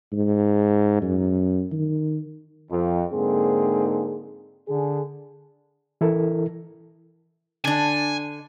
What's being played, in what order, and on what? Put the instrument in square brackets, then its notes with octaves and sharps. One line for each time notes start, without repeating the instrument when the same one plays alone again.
[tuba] G#2
F#2
D#3
[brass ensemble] F2
G#2 D3 A#3 C4 D#4 G#4
D3 G#4
[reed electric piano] E3 E4 A4 A#4
[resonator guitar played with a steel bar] D3 D4 [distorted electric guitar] G#5